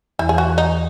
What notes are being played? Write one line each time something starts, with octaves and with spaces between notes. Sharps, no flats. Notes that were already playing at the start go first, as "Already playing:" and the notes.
E2 E3 E4
G#4
F#4
D#4